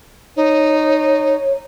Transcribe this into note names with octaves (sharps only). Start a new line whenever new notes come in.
D#4 C#5